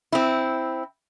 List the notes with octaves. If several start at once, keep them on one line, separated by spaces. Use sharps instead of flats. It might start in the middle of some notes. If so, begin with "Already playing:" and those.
C4 E4